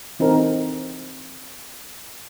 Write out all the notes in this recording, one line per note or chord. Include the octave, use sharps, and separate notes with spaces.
E3 C4 D#4 A4 A#4